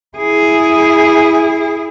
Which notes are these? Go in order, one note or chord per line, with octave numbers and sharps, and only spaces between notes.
E4 G#4